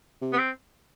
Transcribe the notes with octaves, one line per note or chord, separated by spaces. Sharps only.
C3
B3
C4